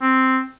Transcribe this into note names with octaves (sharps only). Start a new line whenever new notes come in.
C4